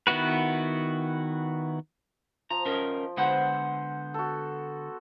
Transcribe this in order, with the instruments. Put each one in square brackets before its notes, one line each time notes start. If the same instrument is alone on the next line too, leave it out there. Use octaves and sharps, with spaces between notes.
[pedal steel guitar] D#3 B3 E4 F#4 B4
[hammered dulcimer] F3 [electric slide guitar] A#5
[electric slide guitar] C#4 A#4 D#5
[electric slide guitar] D3 G#3 F#5 [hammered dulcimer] B3 C5
[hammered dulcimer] F#4 A4